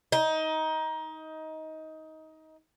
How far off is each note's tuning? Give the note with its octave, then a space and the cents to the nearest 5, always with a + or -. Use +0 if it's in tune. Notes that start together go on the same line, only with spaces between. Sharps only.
D#4 +20